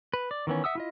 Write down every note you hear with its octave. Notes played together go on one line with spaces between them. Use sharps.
B4
D5
D#3 E3 B3 C#4
E5 F#5 D#6 E6
E4 F4 D#5